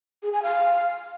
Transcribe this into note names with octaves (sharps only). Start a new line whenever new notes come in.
G#4
G#5
F5